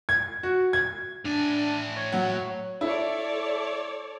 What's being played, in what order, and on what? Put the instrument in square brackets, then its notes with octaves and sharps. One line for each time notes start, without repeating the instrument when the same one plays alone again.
[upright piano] G#6
F#4
G#6
[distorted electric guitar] A2 G#5 [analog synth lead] D4
[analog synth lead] C#5
[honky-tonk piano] F#3 F#5
[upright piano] E4 [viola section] A4 C#5 D5